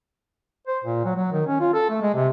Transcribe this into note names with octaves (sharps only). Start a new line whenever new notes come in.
C5
A#2
F#3
F#3
D#3
C#4
F4
A4
A3
G#3
C3